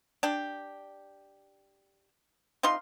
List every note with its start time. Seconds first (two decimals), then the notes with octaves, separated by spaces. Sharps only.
0.23 D4 G4
2.63 C3 D#4 F4 C6